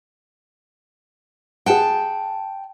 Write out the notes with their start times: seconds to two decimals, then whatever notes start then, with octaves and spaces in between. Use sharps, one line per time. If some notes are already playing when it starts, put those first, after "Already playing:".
1.66 G#4 F#5 G5 A5